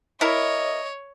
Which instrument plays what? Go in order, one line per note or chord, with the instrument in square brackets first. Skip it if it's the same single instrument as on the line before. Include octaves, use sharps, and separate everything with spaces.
[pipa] E4 A#4 [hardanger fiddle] C#5 [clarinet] D#5